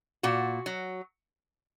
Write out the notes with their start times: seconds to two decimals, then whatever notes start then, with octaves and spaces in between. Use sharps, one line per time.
0.23 A#2 F#4
0.66 F#3